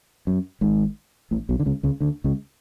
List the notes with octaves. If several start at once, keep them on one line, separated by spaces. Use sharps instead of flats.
F#2
G#1 G#2
A1 A2
B1 B2
D3
C#2 C#3
C#2 C#3
D2 D3
C#2 C#3